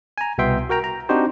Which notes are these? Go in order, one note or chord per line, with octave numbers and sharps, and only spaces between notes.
G#5 A#5
C2 B2 B3 E5 G5 C6
F#4 A#4 G5 A#5
A#5
C4 D4 D#4 F#4 G4 C5